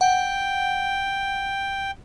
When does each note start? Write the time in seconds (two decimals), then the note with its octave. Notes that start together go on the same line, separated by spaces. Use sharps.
0.01 F#5 G5